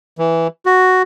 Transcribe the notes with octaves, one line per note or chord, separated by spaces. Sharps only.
E3
F#4